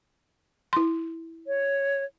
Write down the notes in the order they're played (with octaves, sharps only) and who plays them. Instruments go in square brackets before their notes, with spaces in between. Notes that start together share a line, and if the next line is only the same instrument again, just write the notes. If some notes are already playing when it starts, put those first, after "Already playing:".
[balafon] E4 C6
[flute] C#5